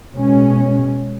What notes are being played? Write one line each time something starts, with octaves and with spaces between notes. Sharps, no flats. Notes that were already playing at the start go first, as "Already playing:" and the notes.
B2 G#3 C#4